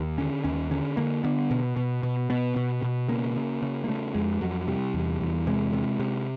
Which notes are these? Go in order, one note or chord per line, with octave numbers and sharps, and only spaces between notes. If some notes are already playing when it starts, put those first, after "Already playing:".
Already playing: D#2
D3 C#4
D#2 C#4
D3 C#4
D3 A#3
D3 B3
B2
B2
B2
B2 B3
B2
B2
C#3 A#3
C#3
C#3
A#3
C#3 A3
F2 G#3
F2 F#3
C3 G3
E2
E2
C3 G#3
C3
C3